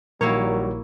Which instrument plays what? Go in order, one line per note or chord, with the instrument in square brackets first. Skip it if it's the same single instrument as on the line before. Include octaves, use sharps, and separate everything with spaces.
[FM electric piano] A#1 [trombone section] D#3 F#3 G3 [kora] A#3 E4 C#5 [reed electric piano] A#4